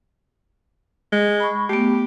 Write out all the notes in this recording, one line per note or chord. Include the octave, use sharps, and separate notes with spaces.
G#3
B5 C#6
A3 B3 G4